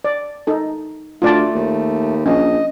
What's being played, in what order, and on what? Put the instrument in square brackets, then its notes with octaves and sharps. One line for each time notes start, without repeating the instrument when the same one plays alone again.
[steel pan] D5
D#4 A4
[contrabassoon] D2 [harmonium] A3 [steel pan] F4 D5 A5
[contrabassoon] D#2
[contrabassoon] A#1 [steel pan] C#4 [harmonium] D#5